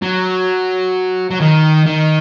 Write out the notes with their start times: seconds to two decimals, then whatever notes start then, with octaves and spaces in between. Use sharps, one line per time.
0.02 F#3
1.31 F#3
1.41 D#3
1.87 D#3